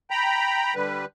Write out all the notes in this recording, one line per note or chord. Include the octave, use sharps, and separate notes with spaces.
G5 A#5 B5
D3 G3 B4